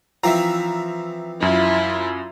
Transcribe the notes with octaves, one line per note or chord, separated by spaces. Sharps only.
E3 F3 C4 E5 A#5
F#2 E4 F4